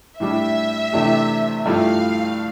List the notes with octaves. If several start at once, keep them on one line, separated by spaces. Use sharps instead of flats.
A2 G3 D4 G4 E5
C3 E3 A3 D4 G4
G2 F3 A3 E4 G4 F5